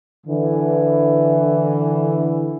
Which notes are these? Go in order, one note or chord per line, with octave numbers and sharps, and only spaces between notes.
D3 E3